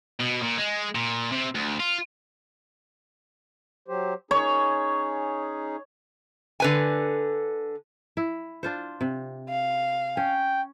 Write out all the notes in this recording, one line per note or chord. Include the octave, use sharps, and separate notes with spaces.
B2
A#2
G#3
A#2
C3
D2
F4
F#3 G4 C5
C#4 D#4 G#4 C#5
D3 B4 G#5
E4
D4 F4 C5
C3
F5
C#4 G5